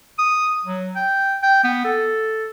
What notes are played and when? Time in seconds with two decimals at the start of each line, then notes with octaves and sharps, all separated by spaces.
0.19 D#6
0.65 F#3
0.96 G5
1.43 G5
1.64 B3
1.85 A4